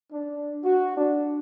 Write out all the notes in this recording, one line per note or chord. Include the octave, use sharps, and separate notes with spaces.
D4
F#4
D4